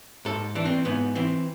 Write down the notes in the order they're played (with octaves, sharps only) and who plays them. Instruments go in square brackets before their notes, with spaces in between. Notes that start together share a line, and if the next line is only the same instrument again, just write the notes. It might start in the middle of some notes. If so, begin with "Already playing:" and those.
[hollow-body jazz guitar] G#2 A4
E3 D4
C4
G#2 B3
E3 C4